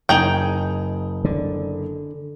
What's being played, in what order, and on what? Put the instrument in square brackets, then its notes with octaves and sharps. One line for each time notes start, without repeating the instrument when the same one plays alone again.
[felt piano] F#1 [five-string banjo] D#4 G#4 G5
[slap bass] D3